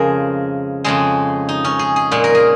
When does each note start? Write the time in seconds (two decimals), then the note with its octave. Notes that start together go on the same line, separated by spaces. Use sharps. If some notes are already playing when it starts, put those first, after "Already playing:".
Already playing: F2 C#3 F3 G#3 G#4 A#4
0.84 F2 C#3 G#3 G#4
1.49 D#4
1.64 C#4
1.79 G#4
1.96 G#4
2.11 A#2 G#3
2.24 A#4
2.35 G#4